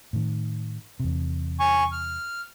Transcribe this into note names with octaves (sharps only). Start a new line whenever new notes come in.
A2 D#3
E2 C3
G#5 C#6
F6